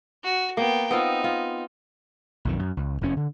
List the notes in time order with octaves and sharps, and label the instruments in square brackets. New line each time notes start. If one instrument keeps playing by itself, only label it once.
[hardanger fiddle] F#4
[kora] A#3 [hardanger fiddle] B3 G5
[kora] B3 C4 F4 [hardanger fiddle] D#4
[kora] F4
[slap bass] B1 F2 D#3
F#2
C#2
F1 E2 C#4
D3